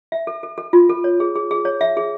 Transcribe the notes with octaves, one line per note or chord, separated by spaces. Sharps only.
E5
A4
A4
A4
F4
A4
C#5
G#4
G#4
G#4
C#5
E5
G#4